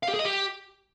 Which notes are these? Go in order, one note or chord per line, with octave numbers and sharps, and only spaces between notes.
F5
G4
G#4
D#5
G4